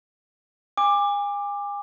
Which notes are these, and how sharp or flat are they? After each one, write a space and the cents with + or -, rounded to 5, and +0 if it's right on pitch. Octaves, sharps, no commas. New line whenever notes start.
G#5 -35 D6 +10